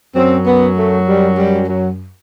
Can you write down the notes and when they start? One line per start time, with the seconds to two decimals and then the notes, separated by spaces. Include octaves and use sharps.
0.15 F#2 F#3 C4
0.46 B3
0.77 A3
1.08 G3
1.38 G3
1.68 F#3